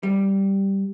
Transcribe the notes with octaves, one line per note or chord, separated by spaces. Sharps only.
G3